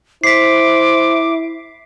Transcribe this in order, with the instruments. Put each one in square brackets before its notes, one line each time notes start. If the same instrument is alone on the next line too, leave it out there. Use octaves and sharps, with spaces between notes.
[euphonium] E4 [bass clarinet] C5 [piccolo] D6 [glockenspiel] B6 C7